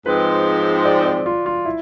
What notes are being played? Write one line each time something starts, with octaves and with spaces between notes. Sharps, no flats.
G#2 F3 G#3 C4 B4
D5
D5
F4
F4
E4